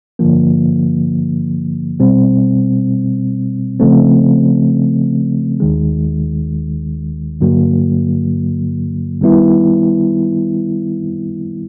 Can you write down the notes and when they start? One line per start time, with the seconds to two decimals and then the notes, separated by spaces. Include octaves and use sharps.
0.19 G2 D3 F3 A#3
2.00 B2 G3 C4
3.80 C#3 F3 A3 C4
5.60 D#2 D#3 G#3
7.41 G2 D3 F#3 A#3
9.21 D#3 G3 B3 E4